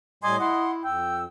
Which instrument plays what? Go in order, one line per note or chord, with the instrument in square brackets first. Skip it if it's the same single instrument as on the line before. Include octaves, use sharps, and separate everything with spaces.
[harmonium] A2 G3 [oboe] D#5 [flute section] G#5 C6 D6
[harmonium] E4 [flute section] F#5 C6
[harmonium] F2 [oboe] G5 [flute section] E6